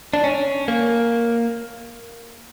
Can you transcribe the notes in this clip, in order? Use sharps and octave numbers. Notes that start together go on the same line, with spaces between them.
D4
C#4
A#3